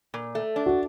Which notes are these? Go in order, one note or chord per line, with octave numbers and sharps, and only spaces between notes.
A#2
A3
D4
F#4